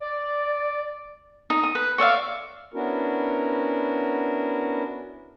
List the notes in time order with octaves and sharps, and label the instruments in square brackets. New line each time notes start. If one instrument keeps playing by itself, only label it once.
[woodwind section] D5
[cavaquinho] D#4
D#6
B4
C#5 D5 E5 F5
[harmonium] B3 C#4 D4 E4 F#4 A#4